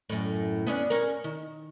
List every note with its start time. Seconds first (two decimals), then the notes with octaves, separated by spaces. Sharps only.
0.09 F#2 A2
0.67 B3 C#4 D4
0.90 C#4 A#4
1.24 D#3